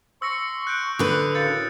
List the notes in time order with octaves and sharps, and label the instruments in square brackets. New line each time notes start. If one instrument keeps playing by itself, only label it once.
[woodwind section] C6 C#6 [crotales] E6 A#6 C#7
[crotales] F#6 G6 D7
[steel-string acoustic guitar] D3 B4 [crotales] D#6
[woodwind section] F#2 A2 F5 [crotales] G6 A6 C#7